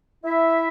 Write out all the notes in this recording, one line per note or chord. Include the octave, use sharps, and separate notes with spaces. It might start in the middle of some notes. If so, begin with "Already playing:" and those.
E4 E5